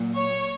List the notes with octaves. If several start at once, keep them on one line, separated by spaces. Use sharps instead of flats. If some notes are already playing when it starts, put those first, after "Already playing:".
Already playing: A#2 F#3
C#5